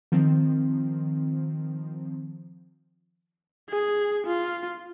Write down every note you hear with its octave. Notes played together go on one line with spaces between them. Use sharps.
D#3 F3 C4
G#4
F4